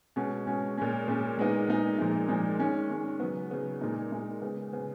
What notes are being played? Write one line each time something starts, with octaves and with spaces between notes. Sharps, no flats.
B2 G#3 C#4
B2 G#3 C#4
A#2 G#3 C#4
A#2 G#3 C#4
A#2 G#3 B3 D#4
A#2 G#3 B3 D#4
A#2 F3 G#3 D#4
A#2 F3 G#3 D#4
D#3 G#3 C#4
D#3 G#3 C#4
C#3 F#3 B3
C#3 F#3 B3
A#2 G#3 D#4
A#2 G#3 D#4
C#3 G#3 B3
C#3 G#3 B3